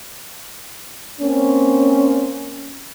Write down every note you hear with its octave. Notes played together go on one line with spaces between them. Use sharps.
A#3 C4 C#4